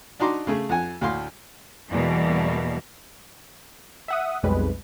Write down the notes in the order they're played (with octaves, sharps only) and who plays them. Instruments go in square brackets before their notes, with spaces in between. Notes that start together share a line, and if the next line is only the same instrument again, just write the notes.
[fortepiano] D4 D#4 F#4 A#5 C6 D6
C#3 A3 G#4
F2 F#5 G#5
D2 A2 F5 C6
[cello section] E2 B2 E3 G3 A#3
[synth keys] E5 F#5 D#6
B1 F2 G3 G#3 B4